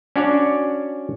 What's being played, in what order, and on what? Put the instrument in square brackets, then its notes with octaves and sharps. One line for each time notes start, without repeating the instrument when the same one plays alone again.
[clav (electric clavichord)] C#4 D4 F#4 C#5 D5